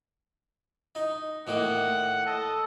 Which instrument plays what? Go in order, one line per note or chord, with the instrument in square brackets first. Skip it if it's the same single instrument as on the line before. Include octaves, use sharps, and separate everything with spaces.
[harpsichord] D#4
[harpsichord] A2 D#3 A#3 [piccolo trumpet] F#5
[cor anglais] A4 [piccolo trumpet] D#5